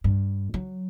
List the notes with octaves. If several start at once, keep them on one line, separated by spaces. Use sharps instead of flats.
G2
F#3